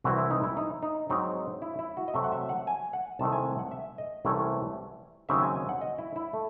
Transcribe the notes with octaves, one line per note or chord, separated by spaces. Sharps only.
C2 C3 E3 C4 F#4
E4
D#4
E4
D#4
D#4
G#2 F#3 C4 D#4
E4
E4
F#4
D#5
C3 F#3 A3 E5
F#5
E5
F#5
G#5
F#5
C2 C3 D#3 A3 A5
G#5
F#5
E5
D#5
C2 C3 E3 A3 C#4
D#2 C#3 F#3 C4 D#4 E5
G#5
G#5
F#5
D#5
E4
E4
A3